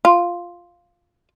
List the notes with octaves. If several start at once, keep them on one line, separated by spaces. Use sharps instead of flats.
F4